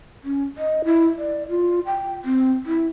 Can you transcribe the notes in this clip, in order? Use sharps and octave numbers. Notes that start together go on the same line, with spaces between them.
C#4
D#5
E4
D5
F4
G5
C4
E4